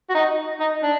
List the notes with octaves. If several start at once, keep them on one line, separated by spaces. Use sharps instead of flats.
F#4
D#4
D#4
D4